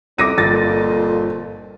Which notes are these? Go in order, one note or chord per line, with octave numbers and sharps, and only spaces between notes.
C2 F2 D6 A#6 D#7
G1 A#2 A6